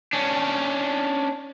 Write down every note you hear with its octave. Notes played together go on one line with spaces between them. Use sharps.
C#4 D4